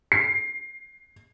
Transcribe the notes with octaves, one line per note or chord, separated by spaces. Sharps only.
C7